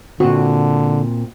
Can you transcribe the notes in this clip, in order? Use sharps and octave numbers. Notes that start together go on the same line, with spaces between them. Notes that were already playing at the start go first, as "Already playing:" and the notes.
A#2 D3 C4 F#4